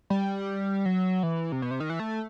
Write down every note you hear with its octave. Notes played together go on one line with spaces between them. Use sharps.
G3
F#3
E3
C3
B2
C3
D#3
E3
A3